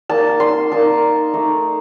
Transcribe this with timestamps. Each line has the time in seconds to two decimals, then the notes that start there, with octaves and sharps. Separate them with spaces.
0.10 A#3 D#4 A5
0.40 C6
0.72 A#3 D#4 A5
1.34 A3 D#4